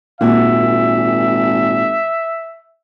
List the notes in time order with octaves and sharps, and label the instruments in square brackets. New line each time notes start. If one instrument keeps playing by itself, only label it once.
[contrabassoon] G#1 [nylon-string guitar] A#2 F#4 [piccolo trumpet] E5